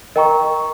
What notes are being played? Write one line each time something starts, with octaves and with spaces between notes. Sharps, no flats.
A#4 D#5 G5 A#5 C#6